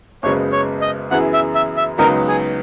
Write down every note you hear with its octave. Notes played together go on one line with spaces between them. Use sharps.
F#1 F#2 C#3 G#3 B3 C#5
C#5
D#5
F#2 E3 B3 E4 G#4 F#5
E5
E5
E5
C#2 C#3 F#3 B3 D#4 A#4
G#4